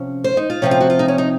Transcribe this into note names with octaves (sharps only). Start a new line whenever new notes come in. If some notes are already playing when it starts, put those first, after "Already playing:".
Already playing: C3 F3 C#4
C5
D#4
F4
C3 F3 C4 C#4
F4
F#4
F4
D#4
C#4
D#4